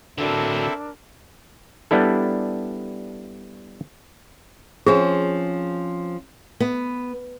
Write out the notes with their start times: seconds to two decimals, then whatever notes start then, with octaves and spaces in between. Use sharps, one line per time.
0.18 D3 F#3 C4 D4 E4 A4 A#4
1.91 G3 B3 D4 E4 A4
4.86 F3 C4 C#4 G#4
6.60 B3